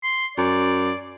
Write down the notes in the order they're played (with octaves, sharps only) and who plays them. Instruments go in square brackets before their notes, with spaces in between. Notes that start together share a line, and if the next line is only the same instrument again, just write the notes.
[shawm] C6
[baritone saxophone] F#2 [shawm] D5